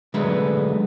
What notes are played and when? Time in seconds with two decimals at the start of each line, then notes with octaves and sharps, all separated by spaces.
0.14 D3 F#3 G#3 A3 B3 B5